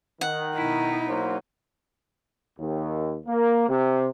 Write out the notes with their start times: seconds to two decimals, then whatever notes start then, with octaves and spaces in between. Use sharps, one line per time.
0.21 D#3 F#5
0.56 B2 D#4 E4
1.08 F#3 A#3 C5
2.59 D#2
3.27 A#3
3.69 C3